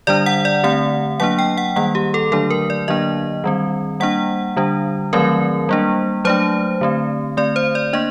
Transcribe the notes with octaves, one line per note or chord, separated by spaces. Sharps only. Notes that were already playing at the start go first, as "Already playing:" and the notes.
D3 G3 D4 D5
F#5
D5
D3 A3 C4 F#5
F#3 A#3 D4 F#5
G5
F#5
D#3 G3 A#3 F#5
G4
A4
D3 F#3 A3 D4 A4
A#4
D5
D3 F#3 A#3 D4 D#5
D#3 G3 C4
G3 A#3 D4 F#5
D3 G3 D4
D#3 F#3 A3 C4 A#4
G3 A#3 D4
F#3 A3 D4 C5
D3 A3 C4
D3 A3 C4 D5
C5
D5
A#3 D4 D#5